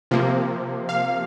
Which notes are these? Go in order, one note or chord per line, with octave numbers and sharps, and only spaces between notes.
C3 F3 A#3
F5